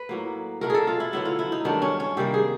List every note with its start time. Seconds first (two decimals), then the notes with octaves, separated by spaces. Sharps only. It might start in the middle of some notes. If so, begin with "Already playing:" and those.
Already playing: B4
0.09 A2 F#3 A#3
0.61 B2 F#3 A3 A#4
0.70 G#4 A4
0.87 F4
1.00 E4
1.13 D3 F#3 B3 E4
1.25 F4
1.39 E4
1.52 D#4
1.65 G2 D#3 F#3 A3 D4
1.82 C#4
2.00 C#4
2.17 C3 D#3 G3 A#3 G4
2.34 G#4